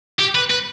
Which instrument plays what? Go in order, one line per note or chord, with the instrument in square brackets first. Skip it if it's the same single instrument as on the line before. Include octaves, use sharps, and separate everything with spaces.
[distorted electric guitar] G4
B4
B4